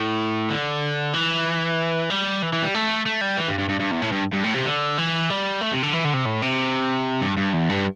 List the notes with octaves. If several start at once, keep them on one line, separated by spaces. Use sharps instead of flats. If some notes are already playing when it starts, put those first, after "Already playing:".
Already playing: A2
D3
E3
G3
E3
E3
G3
A3
A3
G3
E3
G2
G2
G2
G2
E2
A2
G2
G2
A2
C3
D3
E3
G3
A3
C3
D3
E3
D3
C3
A2
C3
G2
G2
E2
G2